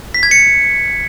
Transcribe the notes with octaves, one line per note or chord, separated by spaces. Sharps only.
B6
G#6
C#7